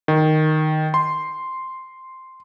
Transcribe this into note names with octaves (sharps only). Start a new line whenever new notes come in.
D#3
C6